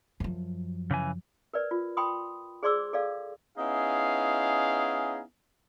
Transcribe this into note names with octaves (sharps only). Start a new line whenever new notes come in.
F#2 F3
C#3 E3 G#5
A#4 B4 D5
F4
G5 B5 C6 D#6
G#4 C5 D5 C6 D6 E6
A4 D5 F5
B3 C#4 D#4 E4 G#4 F5